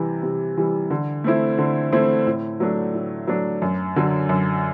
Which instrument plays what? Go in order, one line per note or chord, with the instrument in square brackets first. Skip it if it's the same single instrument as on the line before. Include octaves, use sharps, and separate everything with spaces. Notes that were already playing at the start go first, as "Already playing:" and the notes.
Already playing: [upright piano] C3 E3 G3
C3
E3 G3
D3
A3 C4 E4
D3
A3 C4 E4
A2
F#3 A3 D4
A2
F#3 A3 D4
F#2
D3 F#3
F#2